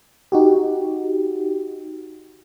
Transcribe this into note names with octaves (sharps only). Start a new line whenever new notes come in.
D#4 F#4 G4